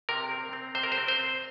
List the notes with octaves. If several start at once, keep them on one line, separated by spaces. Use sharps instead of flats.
C3 A#4
C4
C4
C3 C5
A#4
C5
C4
C5
C4